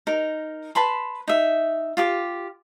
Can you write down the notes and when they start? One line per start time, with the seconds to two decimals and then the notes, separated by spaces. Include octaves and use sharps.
0.07 D#4 A#4
0.75 B4 A5 B5 C6
1.28 D#4 E5
1.97 F4 G4 D6